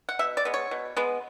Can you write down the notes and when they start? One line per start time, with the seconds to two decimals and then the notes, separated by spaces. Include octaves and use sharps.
0.09 F#5
0.19 B2 E5
0.37 D5
0.45 G#3 B3
0.54 C#5
0.71 B2
0.97 G#3 B3